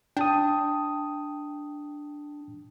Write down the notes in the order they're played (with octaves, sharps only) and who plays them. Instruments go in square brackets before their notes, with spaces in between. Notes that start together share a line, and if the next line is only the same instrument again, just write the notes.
[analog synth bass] D4 [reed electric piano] G5 A5 D#6